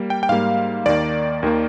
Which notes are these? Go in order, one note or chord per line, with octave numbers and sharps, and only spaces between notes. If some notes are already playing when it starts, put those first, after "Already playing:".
Already playing: G3 A#3
G5
G5
G#2 G3 A#3 F5
D#2 D#3 A#3 D5
D#2 D#3 A#3